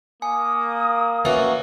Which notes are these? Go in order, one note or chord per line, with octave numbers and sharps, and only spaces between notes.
A#3 G#5 D#6
A#3 C#4 F#4 B4 E5